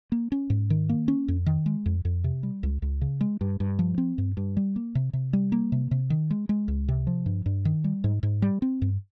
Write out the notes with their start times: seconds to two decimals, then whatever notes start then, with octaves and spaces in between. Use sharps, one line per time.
0.12 A#3
0.32 C#4
0.50 G#2
0.70 D#3
0.89 A#3
1.08 C#4
1.28 F2
1.46 D#3
1.66 G#3
1.86 F2
2.05 F2
2.24 C3
2.43 G3
2.63 C#2
2.82 C#2
3.01 C#3
3.21 G#3
3.41 G2
3.60 G2
3.79 F3
3.98 C4
4.18 G2
4.37 G2
4.57 G3
4.76 A#3
4.95 C3
5.13 C3
5.33 G3
5.52 A#3
5.72 C3
5.91 C3
6.10 D#3
6.31 G#3
6.49 G#3
6.68 C#2
6.88 C3
7.07 F3
7.26 G2
7.46 G2
7.65 D#3
7.84 G3
8.04 G#2
8.23 G#2
8.42 G3
8.62 C4
8.82 G2